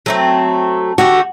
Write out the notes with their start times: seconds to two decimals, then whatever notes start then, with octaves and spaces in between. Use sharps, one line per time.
0.06 F#3 A3 C4
0.98 D3 A3 F#4 G4